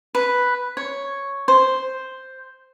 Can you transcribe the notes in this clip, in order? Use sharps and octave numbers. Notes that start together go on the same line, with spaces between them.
B4
C#5
C5